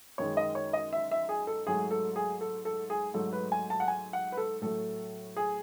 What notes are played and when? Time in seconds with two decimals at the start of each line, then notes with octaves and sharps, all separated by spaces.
0.18 F#2 D#3 G#3 C#5
0.37 D#5
0.55 C#5
0.73 D#5
0.93 E5
1.11 E5
1.29 G#4
1.47 A4
1.67 G#2 F#3 A3 G#4
1.91 A4
2.16 G#4
2.41 A4
2.65 A4
2.90 G#4
3.14 G#2 F#3 A3 A4
3.33 B4
3.52 G#5
3.70 A5
3.80 F#5
3.88 G#5
4.13 F#5
4.32 B4
4.37 A4
4.61 A2 F#3 A3 A4
5.36 G#4